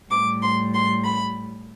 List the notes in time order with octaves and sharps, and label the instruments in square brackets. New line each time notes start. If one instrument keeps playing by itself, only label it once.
[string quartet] A2 G3 D6
C6
C6
B5